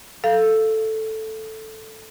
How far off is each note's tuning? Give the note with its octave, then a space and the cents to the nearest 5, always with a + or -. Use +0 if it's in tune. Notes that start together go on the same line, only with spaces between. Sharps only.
A4 +0 F5 -10